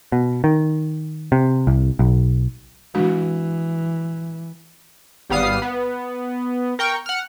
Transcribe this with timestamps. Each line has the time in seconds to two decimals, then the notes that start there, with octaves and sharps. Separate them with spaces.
0.12 B2
0.44 D#3
1.32 C3
1.67 C2
1.99 B1
2.95 E3 G#3 D4 F#4
5.30 G#1 G3 B3 F5 D#6 C7
5.62 B3
6.79 A#4 G5 C#6
7.06 F#5 F6